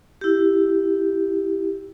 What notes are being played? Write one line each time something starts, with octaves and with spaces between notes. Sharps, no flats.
E4 G4